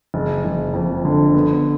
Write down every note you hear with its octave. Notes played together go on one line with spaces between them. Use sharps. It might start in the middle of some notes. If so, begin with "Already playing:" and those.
F#1
F#1
F2
D3
B3